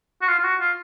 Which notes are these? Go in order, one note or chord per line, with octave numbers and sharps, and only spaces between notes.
F#4
F4
F4
F#4
F4